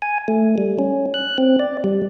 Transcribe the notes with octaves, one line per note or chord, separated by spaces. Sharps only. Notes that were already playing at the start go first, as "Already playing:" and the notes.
G#5
A3
G3
C#4
F#6
C4
D5
G3